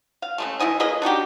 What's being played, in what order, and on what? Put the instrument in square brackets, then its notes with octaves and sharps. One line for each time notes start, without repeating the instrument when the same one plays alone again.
[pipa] F5
C#3 G#3 A3
E3 E4 D#5 G#5
A#3 G#4 B4 D#5
D4 D#4 F#4 G4